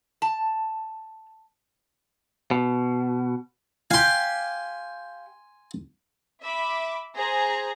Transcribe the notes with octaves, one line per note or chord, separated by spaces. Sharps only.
A5
B2
G4 F5 G#5 C6
E5 B5 D6
G#4 C5 A#5